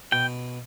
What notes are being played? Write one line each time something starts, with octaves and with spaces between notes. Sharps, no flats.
B2 G5